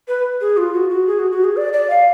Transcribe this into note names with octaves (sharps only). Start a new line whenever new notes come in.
B4
G#4
F4
F#4
F#4
G#4
F#4
F#4
G#4
D5
D5
F5